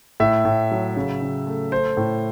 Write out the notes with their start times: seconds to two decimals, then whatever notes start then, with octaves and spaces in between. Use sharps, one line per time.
0.20 A2 E5
0.45 A2
0.71 F#3
0.97 C#3
1.22 C#3
1.47 A3
1.72 A3 C5
1.97 A2